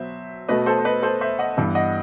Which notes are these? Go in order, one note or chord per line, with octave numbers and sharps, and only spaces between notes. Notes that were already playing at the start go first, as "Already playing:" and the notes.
Already playing: B2 F#3 B3 C5 E5
B2 A3 B4 D#5
A4 C5
C5
B4 D#5
A4 C5
C5 E5
D#5 F#5
G2 E3 B3
D#5 F#5